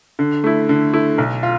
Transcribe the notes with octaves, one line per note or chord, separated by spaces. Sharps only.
D3
A3 E4
D3
A3 E4
B1
F4